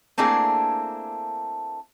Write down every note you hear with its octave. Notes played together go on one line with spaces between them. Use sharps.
A3 A#3 C4 D4 E4 G#4